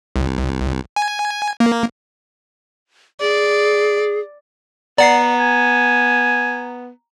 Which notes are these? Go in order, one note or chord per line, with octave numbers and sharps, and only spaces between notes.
C2
G#5
A#3
G#4 D5
B3 D5 F#5 A#5 C7
G#5